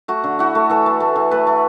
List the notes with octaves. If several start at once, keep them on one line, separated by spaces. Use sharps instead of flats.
A3 F#4
D3
E4 F#4
A3
E3 A4
A3
A3
E3
A3 B4
A3